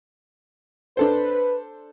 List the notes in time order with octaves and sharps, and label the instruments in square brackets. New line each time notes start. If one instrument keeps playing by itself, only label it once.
[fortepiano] D4 A4 C5 [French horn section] B4